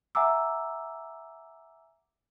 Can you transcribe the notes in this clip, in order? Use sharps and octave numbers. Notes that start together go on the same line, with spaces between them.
E5 F#5 G#5 A#5 D6 E6